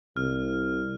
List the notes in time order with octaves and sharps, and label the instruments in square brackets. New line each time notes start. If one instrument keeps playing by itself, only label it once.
[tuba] C2 [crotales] F6